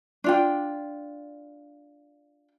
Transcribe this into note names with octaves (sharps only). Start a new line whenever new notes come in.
D4 F4 G5